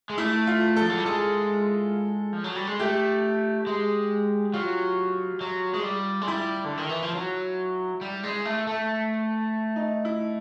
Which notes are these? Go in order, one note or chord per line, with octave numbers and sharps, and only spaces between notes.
G#3
A3 E4
F4
A4
F3
F#3
G3
G#3 A4
F3
F#3
G3
G#3
A3 G4
G#3
F#3 F4
F#3
G#3
G3
G#3
G3 E4
D3
D#3
E3
F3
F#3
G3
G#3
A3
A3
D#4
E4